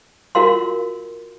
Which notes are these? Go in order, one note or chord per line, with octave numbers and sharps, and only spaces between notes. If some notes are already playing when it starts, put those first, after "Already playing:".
F4 F#4 A#4 F5 C6